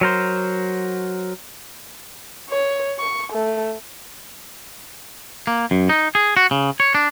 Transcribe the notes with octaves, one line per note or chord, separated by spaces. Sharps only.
F#3 A#4 C5
C#5
C#6
A3
A#3
F#2
D#4
G#4
F#4
C#3
C#5
D4